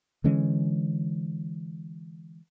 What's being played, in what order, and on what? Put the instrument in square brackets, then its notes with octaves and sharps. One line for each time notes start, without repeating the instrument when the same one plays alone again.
[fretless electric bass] D3 E3 G#3 C#4